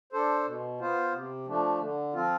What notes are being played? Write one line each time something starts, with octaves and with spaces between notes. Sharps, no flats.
D4 A4 C5
B2
B3 F4 C5
C3
F3 A3 D4
D3
F3 C4 F4